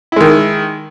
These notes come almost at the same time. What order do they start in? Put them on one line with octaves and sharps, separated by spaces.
E4 G#3 D#3